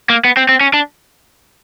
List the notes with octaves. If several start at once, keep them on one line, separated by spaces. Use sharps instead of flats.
A#3
B3
C4
C4
C#4
D4